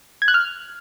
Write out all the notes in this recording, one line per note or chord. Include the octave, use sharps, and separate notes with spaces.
G#6
F#6
F6